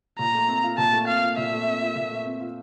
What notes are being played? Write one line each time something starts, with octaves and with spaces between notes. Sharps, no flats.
A#2 A#5
A3
C4
F4
A#2 A5
A3
C4 F5
F4
A#2 E5
A3
C4
F4
A#2
A3
C4
F4